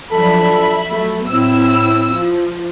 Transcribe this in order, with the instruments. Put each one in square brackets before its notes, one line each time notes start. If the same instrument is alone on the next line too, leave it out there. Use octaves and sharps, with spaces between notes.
[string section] F3 F#3 D4 [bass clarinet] A4 [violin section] E5 B5
[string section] F#3 A3
[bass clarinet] A2 [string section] C4 E4 [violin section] E6
[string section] F3